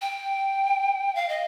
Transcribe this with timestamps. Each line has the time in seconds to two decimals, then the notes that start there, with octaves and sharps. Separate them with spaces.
0.02 G5
1.15 F5
1.29 D#5